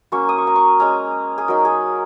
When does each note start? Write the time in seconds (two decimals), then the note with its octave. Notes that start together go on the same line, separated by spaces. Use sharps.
0.12 F#3 A#3 C#4 C#6
0.29 D#6
0.38 C#6
0.47 A#5
0.56 C#6
0.80 G#3 C#4 A#5
1.38 G#4
1.48 F#3 D#4 A#4
1.65 G#4